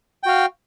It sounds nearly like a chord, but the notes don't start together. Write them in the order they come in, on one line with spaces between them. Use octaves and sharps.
G5 F#4 F5